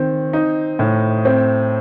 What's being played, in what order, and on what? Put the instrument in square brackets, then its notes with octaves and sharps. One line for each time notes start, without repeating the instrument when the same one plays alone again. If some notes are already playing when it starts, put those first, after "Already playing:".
Already playing: [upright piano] D#3 C4
D#4
A2
C4